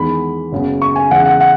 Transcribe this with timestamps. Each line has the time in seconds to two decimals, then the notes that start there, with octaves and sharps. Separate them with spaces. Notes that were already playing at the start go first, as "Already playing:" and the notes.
Already playing: E2 D#3 G#3 B3 B5
0.52 F#1 F#2 C#3 G#3 B3
0.82 C#6
0.96 G#5
1.11 E2 C#3 G#3 F#5
1.26 F#5
1.41 F#5